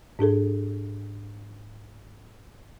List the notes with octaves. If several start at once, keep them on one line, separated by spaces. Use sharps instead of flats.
G#2 D4 G#4 A4